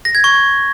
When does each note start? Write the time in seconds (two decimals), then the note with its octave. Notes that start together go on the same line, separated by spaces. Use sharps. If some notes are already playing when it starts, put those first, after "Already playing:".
0.05 A#6
0.15 G#6
0.24 C#6